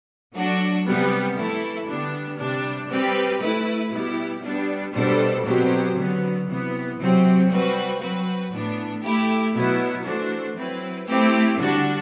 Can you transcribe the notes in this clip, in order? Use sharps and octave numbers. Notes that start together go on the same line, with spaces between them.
F#3 A3 D4 F#4
C3 G3 B3
E3 A3 E4 A4
D3 G3 B3 D4
C3 G3 D4
G3 C4 G4 B4
A3 E4 B4
B2 G3 B3 E4 G4
G3 B3 D4
B2 G3 D4 A4 C5
B2 F#3 C4 G4 C5
D3 F#3 B3
C3 E3 B3
C3 F#3 C4
G3 C4 F#4 B4
F#3 C4 F#4 B4
A2 E3 B3 D4
A3 E4 G4
B2 F#3 B3 E4
E3 A3 D4 F#4 C5
F#3 C4 E4 B4
A3 C4 E4 G4
D3 G3 D4 F#4